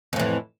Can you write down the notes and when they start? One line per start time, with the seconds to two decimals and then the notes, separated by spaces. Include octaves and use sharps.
0.13 F2
0.16 A2
0.19 E3